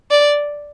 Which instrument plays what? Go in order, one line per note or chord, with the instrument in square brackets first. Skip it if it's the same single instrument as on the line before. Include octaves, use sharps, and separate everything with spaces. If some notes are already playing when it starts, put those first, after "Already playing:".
[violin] D5